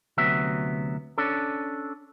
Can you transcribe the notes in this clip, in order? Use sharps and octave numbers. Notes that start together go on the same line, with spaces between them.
D2 C3 F#3 B3 E5
C#4 D4 A4